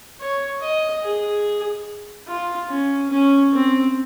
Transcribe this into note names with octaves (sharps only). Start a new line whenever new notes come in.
C#5
D#5
G#4
F4
C#4
C#4
C4